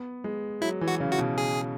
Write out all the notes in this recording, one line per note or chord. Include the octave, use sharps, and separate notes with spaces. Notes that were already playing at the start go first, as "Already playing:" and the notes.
Already playing: B3
G#3
F#3 E4
E3
F#4
C#3
F#4
B2
G#4